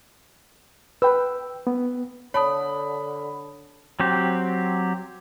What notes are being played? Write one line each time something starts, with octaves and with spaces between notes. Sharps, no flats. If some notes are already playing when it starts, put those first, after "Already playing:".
B4 G5 E6
B3
D3 C#5 A5 B5 D#6
F#3 C4 G4